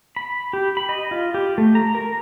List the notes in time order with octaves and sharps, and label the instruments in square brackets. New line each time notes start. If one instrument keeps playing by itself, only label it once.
[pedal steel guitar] B5
G4
B5
D#5
F4
G4
A3
A#5
A#4